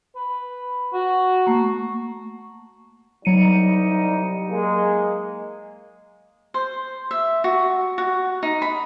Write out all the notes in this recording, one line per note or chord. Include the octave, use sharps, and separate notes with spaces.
B4
F#4
A3 A#3 C#6
C2 F#3 G3 D#4 C#7 D#7
G#3 A#3
C5
E5
F#4
F#4
D#4
B5